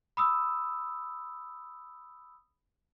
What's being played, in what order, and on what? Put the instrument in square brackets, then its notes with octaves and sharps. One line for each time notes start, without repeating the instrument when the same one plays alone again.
[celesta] B5 D#6 E6